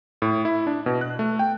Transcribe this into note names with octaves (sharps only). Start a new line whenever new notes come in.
A2
E4
D4
B2
F#6
A3
G5